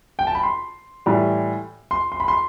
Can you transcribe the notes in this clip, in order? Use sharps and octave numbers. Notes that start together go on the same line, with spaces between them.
G5
A5
B5
C6
A2 E3 G3
C6
C6
B5
C6